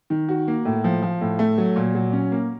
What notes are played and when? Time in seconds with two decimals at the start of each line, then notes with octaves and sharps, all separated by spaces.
0.10 D#3
0.29 F#4
0.48 A#3
0.65 A2
0.84 F3
1.02 F3
1.21 A2
1.39 A3
1.58 F#3
1.76 A#2
1.95 F#3
2.13 C#4
2.32 A#3